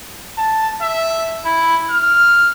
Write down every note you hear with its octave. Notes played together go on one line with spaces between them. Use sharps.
A5
E5
E4
F6